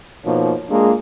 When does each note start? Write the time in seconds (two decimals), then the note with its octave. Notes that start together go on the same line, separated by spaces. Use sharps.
0.24 B2 F3 A#3 D#4 C#5
0.69 G#3 A#3 D4 F4 G#4